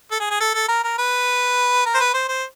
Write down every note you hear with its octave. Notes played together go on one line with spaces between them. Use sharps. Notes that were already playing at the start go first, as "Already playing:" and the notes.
A4
G#4
G#4
A4
A4
A#4
A#4
B4
A#4
C5
B4
C5
C5